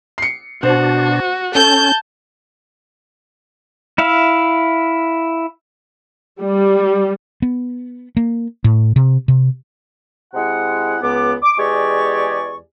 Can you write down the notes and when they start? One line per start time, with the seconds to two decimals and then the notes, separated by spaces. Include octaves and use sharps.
0.18 C7 C#7
0.63 B2 D4 F#4 C5
1.55 C#4 A4 A5 G6
3.98 E4 E5 F5
6.40 G3
7.42 B3
8.17 A#3
8.64 A2
8.96 C3
9.28 C3
10.34 C3 G#3 E4 F#5
11.01 C#2 B3 D6
11.42 D6
11.58 E2 G#3 G4 D5 G#5 C#6